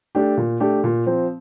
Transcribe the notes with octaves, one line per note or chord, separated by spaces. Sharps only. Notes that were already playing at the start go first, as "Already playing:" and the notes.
A3 D4 G4
A#2
A3 D4 G4
A#2
F3 C4